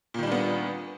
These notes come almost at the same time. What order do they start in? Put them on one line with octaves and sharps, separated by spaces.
A#2 D#3 G3 D4 B3